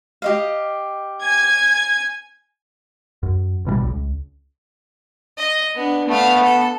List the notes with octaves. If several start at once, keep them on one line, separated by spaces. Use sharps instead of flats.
G4 D#5 F5
G#5 G#6
F#2
A1 B2 D#3 G3
C#2
D#5
B3 D4
A3 B3 F5
A4